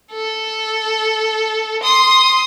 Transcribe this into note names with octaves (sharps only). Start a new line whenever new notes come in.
A4
C6 D#6